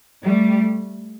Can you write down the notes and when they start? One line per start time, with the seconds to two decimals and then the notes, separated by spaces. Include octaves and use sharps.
0.24 G3 A3